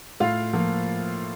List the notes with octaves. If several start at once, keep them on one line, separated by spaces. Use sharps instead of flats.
A2 F4 F5
F3 A#3